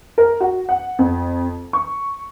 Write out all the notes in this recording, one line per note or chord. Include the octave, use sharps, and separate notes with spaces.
A#4
F#4
F#5
F2
C#6